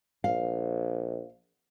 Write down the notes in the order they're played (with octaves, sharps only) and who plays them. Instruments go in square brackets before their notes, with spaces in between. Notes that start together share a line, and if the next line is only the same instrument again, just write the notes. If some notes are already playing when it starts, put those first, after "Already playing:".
[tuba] A#1 [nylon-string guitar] F5